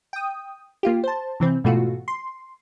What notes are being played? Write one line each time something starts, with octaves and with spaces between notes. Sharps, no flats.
G5 D#6
A#3 F4 G4
C5 A5
C3 E3 C4
G#2 B2 E3 A3 F4 F#4
C6